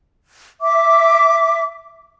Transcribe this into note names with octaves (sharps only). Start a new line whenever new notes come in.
E5 D6